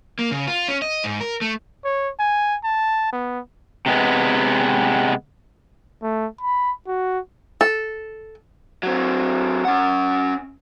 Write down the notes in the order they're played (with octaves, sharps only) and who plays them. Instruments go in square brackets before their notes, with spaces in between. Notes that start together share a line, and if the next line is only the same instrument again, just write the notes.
[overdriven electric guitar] A#3
C#3
F4
C#4
D#5
G#2
A#4
A3
[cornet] C#5
G#5
A5
B3
[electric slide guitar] C3 G#3 B3
[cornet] A3
B5
F#4
[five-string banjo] A4
[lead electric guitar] F#3 C4
C#4 F#5